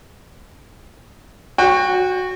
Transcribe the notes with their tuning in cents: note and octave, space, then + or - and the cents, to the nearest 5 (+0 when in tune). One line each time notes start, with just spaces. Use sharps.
F#4 -5 G5 +25